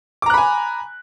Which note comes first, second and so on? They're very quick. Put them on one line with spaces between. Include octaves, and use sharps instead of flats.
D6 A#5 F#6 B5 G#5